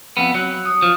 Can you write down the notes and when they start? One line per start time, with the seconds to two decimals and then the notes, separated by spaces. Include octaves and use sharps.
0.17 F2 B3
0.34 F#3
0.66 D#6
0.82 F3